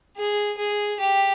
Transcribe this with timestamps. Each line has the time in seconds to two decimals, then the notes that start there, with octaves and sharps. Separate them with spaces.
0.16 G#4
0.57 G#4
1.00 G4